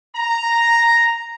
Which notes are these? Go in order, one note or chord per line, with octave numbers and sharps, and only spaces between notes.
A#5